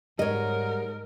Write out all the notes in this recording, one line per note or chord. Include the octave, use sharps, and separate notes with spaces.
G#2 G3 G#3 A#4 C#5 D#5